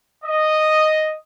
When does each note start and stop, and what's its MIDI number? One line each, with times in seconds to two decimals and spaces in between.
0.24 1.15 75